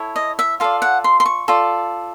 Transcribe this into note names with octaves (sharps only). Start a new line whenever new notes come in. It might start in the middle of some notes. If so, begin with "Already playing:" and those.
Already playing: E4 A4 C#5
D#5
E5
F4 A4 D5 F5
F#5
C6
C6
C#6
F4 A4 D5